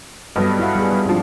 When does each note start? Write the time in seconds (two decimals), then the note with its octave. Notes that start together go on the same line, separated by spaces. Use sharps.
0.36 G2 F#3 G3 B3 A4 D#5
0.59 E4 F5 F#5
0.75 G3 G#4
0.93 G3
1.05 G#2 F3 C4 D4